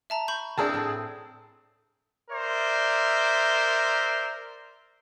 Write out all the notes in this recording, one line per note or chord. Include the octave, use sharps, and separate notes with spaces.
E5 A5 A#5
B5 C#6 G6
A#3 C4 D4 E4 G#4 A5
A2
A#4 C5 D5 E5